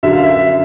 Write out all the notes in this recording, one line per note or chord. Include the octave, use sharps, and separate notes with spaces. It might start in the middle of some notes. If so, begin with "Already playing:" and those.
F#2 D3 F#3 E5
F5
E5